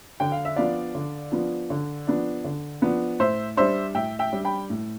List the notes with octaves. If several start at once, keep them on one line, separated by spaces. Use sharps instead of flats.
D3 G5
F5
E5
F3 B3 D4 D5 F5
D3
F3 B3 D4
D3
F3 B3 D4
D3
F3 B3 D4
A2 C5 E5
G3 D4 C5 E5
A2 E5 G5
E5 G5
G3 D4
G5 B5
A2